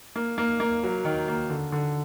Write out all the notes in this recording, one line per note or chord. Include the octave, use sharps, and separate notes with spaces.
A#3
A#3
A#3
F#3
D#3
A#3
D3
D3